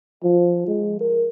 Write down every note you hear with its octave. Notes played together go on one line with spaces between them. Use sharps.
F3
G#3
A#4